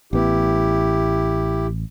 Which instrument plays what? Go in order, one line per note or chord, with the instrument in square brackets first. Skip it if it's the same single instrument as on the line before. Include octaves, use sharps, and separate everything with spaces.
[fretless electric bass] A1 B3 [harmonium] E4 G4